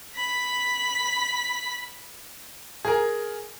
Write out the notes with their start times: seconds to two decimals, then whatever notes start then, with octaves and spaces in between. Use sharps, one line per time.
0.16 B5 B6
2.85 G#4 A#4